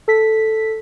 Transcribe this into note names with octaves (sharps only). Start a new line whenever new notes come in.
A4 B6